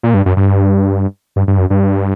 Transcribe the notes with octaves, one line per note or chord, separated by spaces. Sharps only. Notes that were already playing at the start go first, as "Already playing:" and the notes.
A#2
G2
F#2
G2
G2
G2
F#2
G2